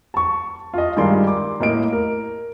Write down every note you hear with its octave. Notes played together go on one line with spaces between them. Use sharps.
A5 C#6
F4 D#5
G2 D#3 G#3 A#4 D5 C6
D6
A2 A#3 D#5 D7
A#4